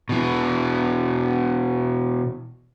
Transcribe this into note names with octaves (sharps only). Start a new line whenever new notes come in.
B2 E3